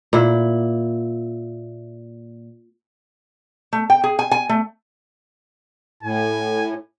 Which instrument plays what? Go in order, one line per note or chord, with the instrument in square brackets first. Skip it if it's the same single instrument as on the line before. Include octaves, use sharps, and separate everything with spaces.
[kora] A#2 E4
[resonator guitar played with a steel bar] A3
G5
G#4
G#5
G#5
A3
[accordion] A2 [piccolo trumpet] G#5